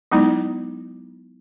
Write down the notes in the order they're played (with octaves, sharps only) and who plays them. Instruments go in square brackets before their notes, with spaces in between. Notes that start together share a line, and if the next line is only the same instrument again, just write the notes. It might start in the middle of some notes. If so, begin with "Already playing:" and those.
[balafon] F#3 G#3 B3 D#4 E4